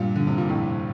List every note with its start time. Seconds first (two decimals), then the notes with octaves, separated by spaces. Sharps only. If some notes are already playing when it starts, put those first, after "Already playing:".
Already playing: G2 A#2
0.16 D3
0.27 C3
0.38 A#2
0.49 F2 A2